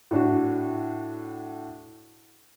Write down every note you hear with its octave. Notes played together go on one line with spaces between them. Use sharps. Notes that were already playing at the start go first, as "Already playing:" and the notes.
A2 D4 F#4